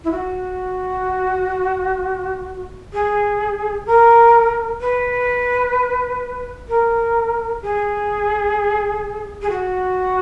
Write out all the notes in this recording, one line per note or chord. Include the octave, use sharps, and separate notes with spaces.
E4
F#4
G#4
A#4
B4
A#4
G#4
G#4
F#4